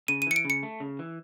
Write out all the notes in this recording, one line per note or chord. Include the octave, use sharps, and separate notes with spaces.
C#3 D#7
D#7
E3 C#7
D7
C#3 C#7
A3
C#3
E3